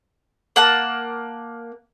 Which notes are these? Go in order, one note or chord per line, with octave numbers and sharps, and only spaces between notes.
A#3 F#5 A5